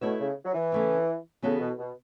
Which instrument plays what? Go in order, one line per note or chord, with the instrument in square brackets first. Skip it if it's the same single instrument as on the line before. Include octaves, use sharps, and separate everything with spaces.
[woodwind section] B2 [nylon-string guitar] A3 E4 C#5 E5
[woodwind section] C#3
F#3
E3
[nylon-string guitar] C#3 A3 C#4
[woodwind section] C#3 [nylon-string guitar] E3 B3 F#4 A4
[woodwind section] B2
B2